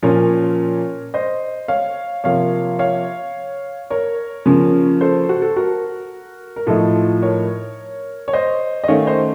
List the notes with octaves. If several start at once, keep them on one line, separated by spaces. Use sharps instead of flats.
A#2 F3 A#3 C#4 A#4 C#5
C5 D#5
C#5 F5
C3 F3 A#3 C#5 F5
C#5 F5
A#4 C#5
C#3 F3 A#3 C#4
A4 C5
F#4
A4
F#4 A#4
A#4
A2 F3 A3 D#4 F4 A4
A#4 C#5
C#5
C5 D#5
D#5
D#3 A3 C#4 C#5 F5
C5 D#5